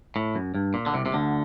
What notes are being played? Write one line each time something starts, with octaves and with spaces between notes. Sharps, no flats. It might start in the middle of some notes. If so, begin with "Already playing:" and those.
A2
F#2
G2
A#2
D3
C2 C3
C3
D2 D3